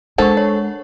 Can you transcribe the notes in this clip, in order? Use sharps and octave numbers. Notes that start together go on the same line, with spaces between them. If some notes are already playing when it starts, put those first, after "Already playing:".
G#3 D4 A4 A#4 C5 F#5 C#6
C#5